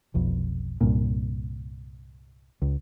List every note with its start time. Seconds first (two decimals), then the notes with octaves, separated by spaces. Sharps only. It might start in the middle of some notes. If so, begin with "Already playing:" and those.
0.14 F1 B1 F2
0.81 C2 G2 A#2
2.62 C#2